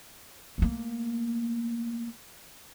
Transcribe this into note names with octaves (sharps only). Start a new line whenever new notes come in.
A3 A#3